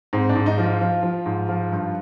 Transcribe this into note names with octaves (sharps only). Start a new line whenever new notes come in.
G#2 C4
D4
G#2
D#4
F3
F4
F3
F3
G#2
F3
G2